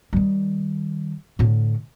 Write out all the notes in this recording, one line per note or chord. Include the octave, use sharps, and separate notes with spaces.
D#3 G3
A2 D3